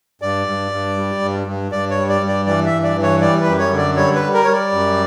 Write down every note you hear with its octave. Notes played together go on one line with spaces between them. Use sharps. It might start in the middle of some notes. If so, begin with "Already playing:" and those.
G2 D5
G2
G2
G3
G2
G2
G2 D5
C#5
G3
D5
G2
D5
E3 D5
E5
G2
D5
E3
C#5
G3 D5
B4
F#2
C#5
D3
D5
G3 C#5
B4
G3
A#4
G3 C#5
D5
F#2